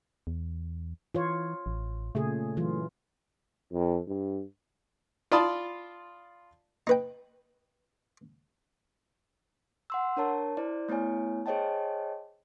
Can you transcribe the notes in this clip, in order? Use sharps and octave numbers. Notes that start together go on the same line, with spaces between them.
E2
E3 F4 C#5
A1
A#2 C#3 A3 G#4
E3 F#3 F4
F2
G2
F4 D5 A5 B5 C6 D#6
D#4 B4 G5
F#5 C6 E6
D4 A#4 C#5 A5
E4 C5 D5
A3 B3 E4 C#5 G#5
G#4 C5 C#5 D#5 G5 A5